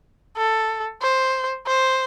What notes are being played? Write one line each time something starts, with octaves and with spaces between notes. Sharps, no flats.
A4
C5
C5